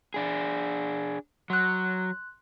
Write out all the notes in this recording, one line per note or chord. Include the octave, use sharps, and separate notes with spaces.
D4 G#4
F#3 C6 F#6